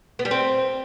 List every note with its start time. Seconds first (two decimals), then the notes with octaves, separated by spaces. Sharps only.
0.19 B3
0.25 G3
0.31 C4